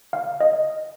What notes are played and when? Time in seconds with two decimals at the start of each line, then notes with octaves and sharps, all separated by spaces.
0.13 F5
0.40 D#5